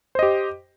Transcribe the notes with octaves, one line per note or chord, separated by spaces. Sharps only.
G4 C5 D#5